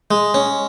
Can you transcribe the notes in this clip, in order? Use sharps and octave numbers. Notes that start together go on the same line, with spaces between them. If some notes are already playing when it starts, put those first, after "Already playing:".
G#3
C#4